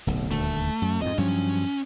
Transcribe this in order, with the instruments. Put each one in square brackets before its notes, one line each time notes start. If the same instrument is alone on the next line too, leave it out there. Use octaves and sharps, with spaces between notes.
[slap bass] D1 B1
[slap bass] D#1 D2 [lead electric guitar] A3
[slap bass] F#2
[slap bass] F2 G#2 [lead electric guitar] D#5
[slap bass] G2 F3 F#3 [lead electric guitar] C#4